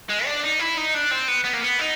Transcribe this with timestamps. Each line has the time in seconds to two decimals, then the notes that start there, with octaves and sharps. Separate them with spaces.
0.10 G#3
0.26 D4
0.43 D#4
0.59 E4
0.77 D#4
0.94 D4
1.11 C4
1.28 B3
1.44 B3
1.53 A#3
1.61 B3
1.79 D#4